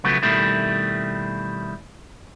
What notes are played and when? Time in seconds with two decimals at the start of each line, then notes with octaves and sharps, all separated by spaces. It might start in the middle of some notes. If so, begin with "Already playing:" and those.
0.04 C#3 F3 F#3 A3 B3
0.23 B2 D#3 G3 A3 C4 E4